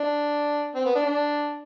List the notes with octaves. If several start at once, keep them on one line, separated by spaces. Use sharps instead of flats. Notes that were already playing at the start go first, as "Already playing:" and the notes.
Already playing: D4
C4
B3
D4
D4